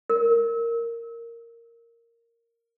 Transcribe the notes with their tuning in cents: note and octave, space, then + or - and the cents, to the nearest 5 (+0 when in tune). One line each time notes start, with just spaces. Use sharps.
A#4 -10